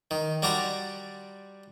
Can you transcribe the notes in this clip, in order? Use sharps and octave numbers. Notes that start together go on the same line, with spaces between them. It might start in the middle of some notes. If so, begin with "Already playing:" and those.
D#3
G3 F#4 D5 A#5 C6